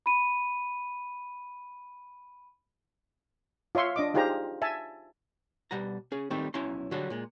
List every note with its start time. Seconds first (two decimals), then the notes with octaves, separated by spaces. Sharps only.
0.06 B5 D#7
3.75 F4 C#5 E5 C6 C#6
3.96 D4 D#5 D6
4.14 D#4 F4 G4 G#4 C5 A#5
4.62 E5 G#5 A5
5.71 B2 G3 F#5 A#5
6.12 C#4 G#4
6.30 D#3 G3 A3 C4 D#4
6.54 B1 C#4 E4 A#5 C6
6.91 D3 F#3 G3 D4 F#4 G#4
7.10 A#2 G#3